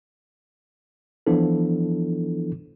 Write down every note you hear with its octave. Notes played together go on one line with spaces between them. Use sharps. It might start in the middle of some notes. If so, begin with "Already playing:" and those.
E3 F3 B3 D4 E4 A4